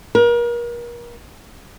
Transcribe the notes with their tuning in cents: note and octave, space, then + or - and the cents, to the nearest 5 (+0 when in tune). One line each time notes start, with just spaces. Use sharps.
A#4 +35